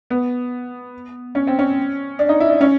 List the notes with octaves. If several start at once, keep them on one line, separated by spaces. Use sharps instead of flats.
B3
C#4
C4
C#4
D4
D#4
E4
D4
C#4